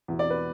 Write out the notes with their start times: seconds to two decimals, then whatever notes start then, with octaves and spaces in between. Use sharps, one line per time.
0.08 E2 B2
0.19 D5
0.30 B4